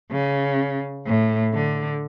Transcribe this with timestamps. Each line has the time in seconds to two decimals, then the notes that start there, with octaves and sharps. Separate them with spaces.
0.11 C#3
1.06 A2
1.54 D3